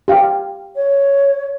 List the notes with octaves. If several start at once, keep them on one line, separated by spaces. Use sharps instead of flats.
G4 F5
C#5